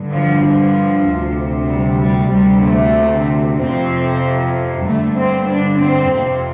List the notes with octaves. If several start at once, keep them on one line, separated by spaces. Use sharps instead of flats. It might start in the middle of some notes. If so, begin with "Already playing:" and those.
Already playing: G2 D3
F3
F3
D2 C3
G3
G3
D2 C3 G3
A3
F2 C3 C4
G2 D3 A3
C4
D4
C4
F2 C3